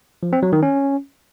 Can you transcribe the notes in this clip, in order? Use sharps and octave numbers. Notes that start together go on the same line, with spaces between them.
F3
C4
F#3
D#3
C#4